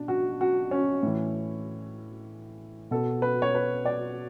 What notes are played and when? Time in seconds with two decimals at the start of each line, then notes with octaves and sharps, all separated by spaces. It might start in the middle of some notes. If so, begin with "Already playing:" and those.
Already playing: B2 D4
0.08 F#4
0.41 F#4
0.71 C#4
1.03 A2 E3
2.91 B2 A4
3.22 B4
3.42 C#5
3.55 B4
3.85 D5